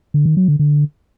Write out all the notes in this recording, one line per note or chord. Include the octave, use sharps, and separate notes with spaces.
D3
D#3
F#3
D3
D3